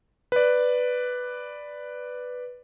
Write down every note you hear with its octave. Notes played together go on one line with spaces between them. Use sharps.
B4 D5